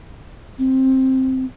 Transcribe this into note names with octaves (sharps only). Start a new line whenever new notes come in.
C4